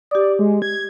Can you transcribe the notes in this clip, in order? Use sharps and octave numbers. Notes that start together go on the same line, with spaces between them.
G4 D5 D#6
G#3
G#6